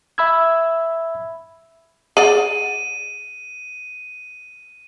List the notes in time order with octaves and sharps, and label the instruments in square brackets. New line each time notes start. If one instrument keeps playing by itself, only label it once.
[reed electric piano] E5 B5 E6 G#6
[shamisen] G#4 D5 F#5 [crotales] D#7